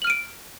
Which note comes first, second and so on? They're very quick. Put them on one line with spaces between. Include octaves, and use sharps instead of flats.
F#7 F6 D#7 D7